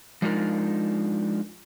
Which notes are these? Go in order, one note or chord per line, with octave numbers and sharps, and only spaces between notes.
F3 G#3 D4 D#4 F4 A#4